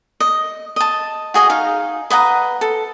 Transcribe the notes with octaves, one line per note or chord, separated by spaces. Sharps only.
D#5
D#5 A5
F#4 G#4 D#5 G#5
D#4 F5
B4 D#5 F#5 A#5
A4